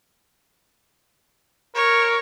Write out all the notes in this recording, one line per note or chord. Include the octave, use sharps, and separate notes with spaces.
A#4 C#5